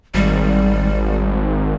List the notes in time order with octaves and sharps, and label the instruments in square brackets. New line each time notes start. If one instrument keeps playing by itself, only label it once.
[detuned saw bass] G#1 [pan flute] G3